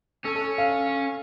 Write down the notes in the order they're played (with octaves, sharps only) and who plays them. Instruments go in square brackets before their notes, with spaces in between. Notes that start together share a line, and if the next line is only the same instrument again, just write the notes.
[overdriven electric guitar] C#4 [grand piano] A4
[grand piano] A4
F5